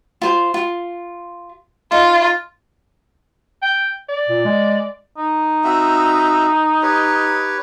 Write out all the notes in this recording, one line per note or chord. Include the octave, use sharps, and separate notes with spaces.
F4 C5
F4
D#4 F4
G5
D5
A#2
G#3
D#4
C4 F#4 E5
G4 B4 C#5